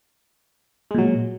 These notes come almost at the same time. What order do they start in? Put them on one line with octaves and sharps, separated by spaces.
G#3 A#2 F#3